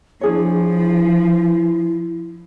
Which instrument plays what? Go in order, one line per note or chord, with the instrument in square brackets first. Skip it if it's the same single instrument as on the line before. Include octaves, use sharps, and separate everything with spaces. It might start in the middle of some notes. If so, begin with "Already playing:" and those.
[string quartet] F3 [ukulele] D4 G#4 C#5 [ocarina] E4